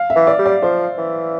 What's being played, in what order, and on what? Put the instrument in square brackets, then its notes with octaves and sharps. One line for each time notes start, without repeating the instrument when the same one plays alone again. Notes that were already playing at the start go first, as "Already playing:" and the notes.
Already playing: [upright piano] F5
E5
[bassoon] E3
[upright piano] D5
[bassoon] G3
[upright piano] D5
[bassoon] F3 [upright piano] C5
[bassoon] E3